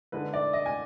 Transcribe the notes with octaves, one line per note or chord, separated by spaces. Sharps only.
D3 G#3 D#4 B4
D5
D#5
G#5